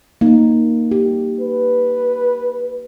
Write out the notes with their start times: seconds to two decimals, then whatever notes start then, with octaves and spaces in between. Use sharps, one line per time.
0.21 A#3 D#4
0.91 G4
1.40 B4